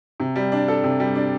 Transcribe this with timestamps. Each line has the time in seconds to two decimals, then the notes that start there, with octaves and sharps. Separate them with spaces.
0.20 C3
0.36 G3
0.52 D4
0.68 A4
0.84 C3
1.00 G3
1.15 D4